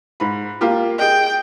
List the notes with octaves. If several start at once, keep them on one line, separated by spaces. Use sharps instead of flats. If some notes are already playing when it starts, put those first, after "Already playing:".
G#2 B5
A#3 F4 G4
G#4 D#5 G5